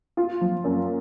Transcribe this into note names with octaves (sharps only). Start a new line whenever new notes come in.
F4
F3
F#2